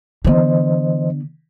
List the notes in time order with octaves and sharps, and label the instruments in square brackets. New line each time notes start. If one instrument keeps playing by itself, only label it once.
[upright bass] D3 B3 [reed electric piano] E3 C5 D#5